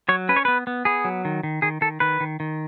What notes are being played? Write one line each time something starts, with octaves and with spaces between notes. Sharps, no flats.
F#3 C#5
C#4 B4
C#5
B3 B4
B3
B3 G#4
F#3
D#3
D#3
D#3 G#4
D#3 A4
D#3 B4
D#3
D#3